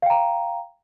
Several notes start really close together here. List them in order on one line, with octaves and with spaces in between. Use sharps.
F5 G5 A#5